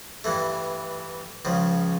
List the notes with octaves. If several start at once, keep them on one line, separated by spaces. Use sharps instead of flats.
G2 E3 A3
C#2 C#3 F3